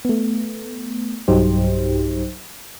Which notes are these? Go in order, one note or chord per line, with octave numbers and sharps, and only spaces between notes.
A3 B3
B1 G2 F#3 D#4 G4 C5